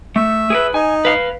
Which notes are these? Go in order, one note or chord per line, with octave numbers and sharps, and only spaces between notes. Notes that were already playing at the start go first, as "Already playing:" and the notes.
A3 E5
G#4 A#4 B4
D#4 G#5
B4 F5